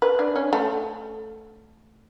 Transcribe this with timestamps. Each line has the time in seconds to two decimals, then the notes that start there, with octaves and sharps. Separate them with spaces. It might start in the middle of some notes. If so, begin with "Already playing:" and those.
0.02 B4
0.19 D4
0.36 C#4
0.53 A3